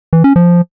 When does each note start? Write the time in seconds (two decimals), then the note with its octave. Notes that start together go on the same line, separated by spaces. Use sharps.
0.13 E3
0.24 C#4
0.36 F3